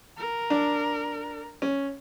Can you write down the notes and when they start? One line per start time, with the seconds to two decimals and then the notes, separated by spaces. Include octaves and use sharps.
0.17 A#4
0.50 D4
1.62 C#4